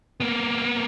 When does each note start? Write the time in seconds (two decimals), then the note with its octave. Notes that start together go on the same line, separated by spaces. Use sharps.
0.20 A#3 B3